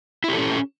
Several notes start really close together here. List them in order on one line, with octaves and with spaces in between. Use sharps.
E4 G4 A4 C#4